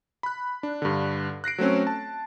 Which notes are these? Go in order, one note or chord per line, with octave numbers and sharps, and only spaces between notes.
B5 F#6
D4
G2 D3
F#6 A#6 C7 D7
F#3 A3 C4 C#4
A5